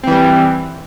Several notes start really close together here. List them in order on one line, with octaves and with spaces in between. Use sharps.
C4 E3 G3